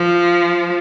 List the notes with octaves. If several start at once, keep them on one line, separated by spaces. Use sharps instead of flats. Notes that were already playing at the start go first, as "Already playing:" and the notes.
Already playing: F3